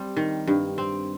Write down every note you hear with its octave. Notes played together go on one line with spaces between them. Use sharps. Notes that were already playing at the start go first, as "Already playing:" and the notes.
Already playing: G3 C4
D#3
G2
C4